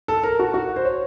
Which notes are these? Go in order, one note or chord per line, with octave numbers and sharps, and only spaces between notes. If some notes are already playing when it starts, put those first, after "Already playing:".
A4
A#4
F#4
F#4
C5
C#5